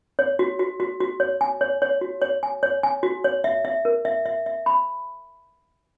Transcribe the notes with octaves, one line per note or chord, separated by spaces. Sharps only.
C#5
F#4
F#4
F#4
F#4
C#5
G#5
C#5
C#5
F#4
C#5
G#5
C#5
G#5
F#4
C#5
E5
E5
A#4
E5
E5
E5
B5